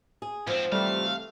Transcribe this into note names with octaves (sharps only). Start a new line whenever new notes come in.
G#4
G#2 F3 C4
C3 E3 G3 A3 F5